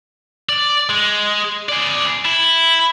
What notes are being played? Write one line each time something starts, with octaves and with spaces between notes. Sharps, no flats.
D5
G#3
G#4 D5
E4